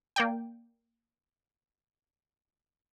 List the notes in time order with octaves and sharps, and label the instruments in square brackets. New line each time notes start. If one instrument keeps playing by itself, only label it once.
[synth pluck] A#3 D5 G5